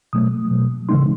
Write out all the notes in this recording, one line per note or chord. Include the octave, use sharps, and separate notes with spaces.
B2 F#3 A3 D#6
B2 F#3 A3
C#3 E3 G#3 C4 D#4 C6